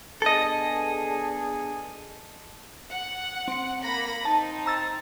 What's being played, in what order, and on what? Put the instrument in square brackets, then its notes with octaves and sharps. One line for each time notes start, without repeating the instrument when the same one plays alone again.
[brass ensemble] B3 D4 G#4 [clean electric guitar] A4 D#5
[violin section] F#5
[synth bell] C4 C#7
[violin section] A#3 B5 A#6
[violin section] C4 D#4 [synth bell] A5
[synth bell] A#5 E6 A6